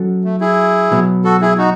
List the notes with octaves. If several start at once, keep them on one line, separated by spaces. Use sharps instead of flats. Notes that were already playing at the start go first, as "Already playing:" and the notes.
Already playing: F#3 C#4 F#4 A4
A3
E4 G#4
B2 F#3 B3
F#4 A4
E4 G#4
D#4 F#4